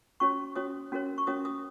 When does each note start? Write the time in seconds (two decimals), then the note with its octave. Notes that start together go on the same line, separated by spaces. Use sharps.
0.20 C#4 F#4 C#5 C#6
0.56 C#4 F#4 C#5 D#6
0.92 C#4 F#4 A#4 C#5
1.18 C#6
1.27 C#4 F#4 A#4 C#5 D#6
1.45 D#6